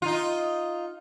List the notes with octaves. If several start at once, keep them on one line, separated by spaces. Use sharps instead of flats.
D#4 F4